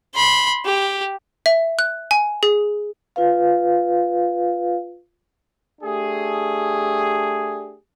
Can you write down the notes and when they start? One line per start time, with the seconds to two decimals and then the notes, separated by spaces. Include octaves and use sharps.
0.15 B5 C6
0.65 G4
1.46 E5
1.79 F#6
2.11 G#5
2.43 G#4
3.16 F4 B4 F5
5.82 A3 D4 G4 G#4